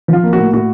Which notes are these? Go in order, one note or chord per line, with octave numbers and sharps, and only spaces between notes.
F3 F4
A#3
F#4
A2
A2 F#4